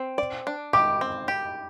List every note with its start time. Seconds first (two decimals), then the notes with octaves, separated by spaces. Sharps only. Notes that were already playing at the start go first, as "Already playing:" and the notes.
Already playing: C4
0.18 D5
0.47 D4
0.73 G4 D6
1.01 C4
1.28 G4